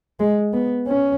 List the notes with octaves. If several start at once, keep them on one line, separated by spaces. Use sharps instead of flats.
G#3
B3
C#4